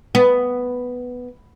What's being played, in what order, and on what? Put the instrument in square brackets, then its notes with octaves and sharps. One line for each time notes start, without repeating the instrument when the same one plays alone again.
[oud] B3